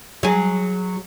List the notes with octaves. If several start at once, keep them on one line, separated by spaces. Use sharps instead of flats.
F#3 G#4